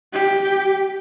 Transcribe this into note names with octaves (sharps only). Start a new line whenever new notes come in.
G4